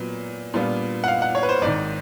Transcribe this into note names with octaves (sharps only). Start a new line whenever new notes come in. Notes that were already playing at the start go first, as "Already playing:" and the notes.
Already playing: A#2 F#3 B3
A#2 G3 B3 D4 F4
F#5
F5
F#5
C#5
B4
C5
G#1 G#2 D#3 D5